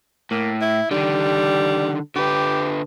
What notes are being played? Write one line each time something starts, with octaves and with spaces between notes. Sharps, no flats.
A2 A#3
E4
D3 D#3 G3
D3 G4 B4